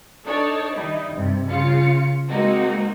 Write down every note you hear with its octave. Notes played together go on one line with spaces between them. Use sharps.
D4 D#4 A4 C#5 D5 A5
D#3 G3 D#4 E4
G2 C3
C#3 F4 F5 C#7
G#3 A#3 C4 D#4 F#4